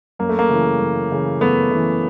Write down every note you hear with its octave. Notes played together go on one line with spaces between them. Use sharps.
F#2 A#3
A3
A#3
C#3 E3
F#2
C#3 E3
F#2 A3 B3
C#3 E3